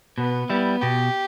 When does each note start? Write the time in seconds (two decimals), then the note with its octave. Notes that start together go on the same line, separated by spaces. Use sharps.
0.18 B2 B3
0.50 G3 B3 E4
0.81 B2 G4